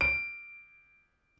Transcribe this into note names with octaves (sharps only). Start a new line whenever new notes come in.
D7